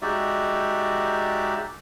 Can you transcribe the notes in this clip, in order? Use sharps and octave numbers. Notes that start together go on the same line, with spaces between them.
G#3 D#4 F#4 G4 D5 E5